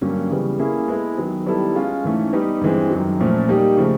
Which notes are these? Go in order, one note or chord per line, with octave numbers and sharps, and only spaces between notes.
G2 D3 F#3 A#3 C#4
C#3 E3 G3 B3
A#3 C#4 E4 G#4
G#3 B3 E4 A4
D#3 F#3 B3
D#3 G3 B3 E4 A4
G#3 C#4 F4
G#2 E3 A3 C#4
G3 B3 D#4 G4
G2 E3 G#3 C4
F#2 D#3 F#3
A#2 F3 A3 C#4
G3 A#3 D#4 G4
C#3 F3 A3